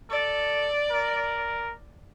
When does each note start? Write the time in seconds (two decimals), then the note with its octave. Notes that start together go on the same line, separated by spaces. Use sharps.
0.10 A4 D5
0.91 A#4